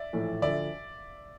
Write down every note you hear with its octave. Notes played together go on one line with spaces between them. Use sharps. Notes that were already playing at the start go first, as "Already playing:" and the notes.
Already playing: D5 E5
A#1 A2 E3 A3
D2 D3 F3 D5 E5